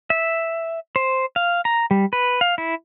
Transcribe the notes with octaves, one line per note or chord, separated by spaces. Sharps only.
E5
C5
F5
A#5
G3
B4
F5
E4